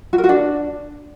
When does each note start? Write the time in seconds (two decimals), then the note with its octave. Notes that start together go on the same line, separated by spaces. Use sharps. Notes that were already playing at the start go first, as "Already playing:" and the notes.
0.13 F#4
0.18 A#4
0.24 F#4
0.29 D4